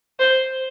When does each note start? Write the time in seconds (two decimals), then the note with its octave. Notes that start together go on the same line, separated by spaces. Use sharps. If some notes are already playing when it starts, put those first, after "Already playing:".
0.20 C5